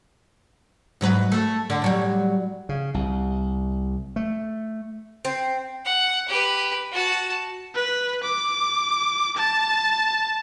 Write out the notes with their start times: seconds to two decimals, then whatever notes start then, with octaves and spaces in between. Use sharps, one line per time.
1.01 G#2 F#3 B4
1.32 A3
1.70 D3
1.82 A2 F#3 G3
2.69 C#3
2.94 C2
4.16 A3
5.25 C4
5.85 F#5
6.28 G4 B4
6.92 F#4 A5
7.75 B4
8.23 D6
9.37 A5